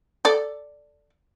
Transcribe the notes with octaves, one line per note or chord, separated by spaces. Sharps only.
A4 D5